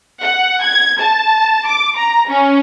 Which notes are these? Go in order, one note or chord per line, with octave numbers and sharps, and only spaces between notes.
F#5
G#6
A5
D6
A#5
C#4